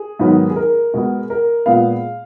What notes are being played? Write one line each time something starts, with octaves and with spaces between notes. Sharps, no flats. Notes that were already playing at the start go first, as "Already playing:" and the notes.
Already playing: G#4
G#2 D#3 F#3 B3
G#4
A#4
B2 G#3 B3
A#4
A#2 G#3 B3 F5